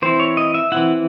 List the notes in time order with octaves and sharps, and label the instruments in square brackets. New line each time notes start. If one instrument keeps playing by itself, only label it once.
[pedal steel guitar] E3 C4 E4 C5
C#5
D#5
E5
E3 C4 E4 F#5